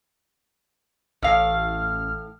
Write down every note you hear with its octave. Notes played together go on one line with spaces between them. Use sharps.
A1 A2 F5 F6